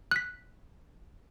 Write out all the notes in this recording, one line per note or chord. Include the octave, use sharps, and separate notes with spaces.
F#6 B6